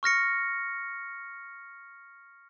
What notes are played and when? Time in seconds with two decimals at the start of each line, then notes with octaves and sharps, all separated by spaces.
0.03 C#6 F6 A#6 C#7